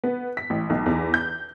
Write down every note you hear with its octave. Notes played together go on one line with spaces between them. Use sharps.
B3
B6
A1
B1
E2
G6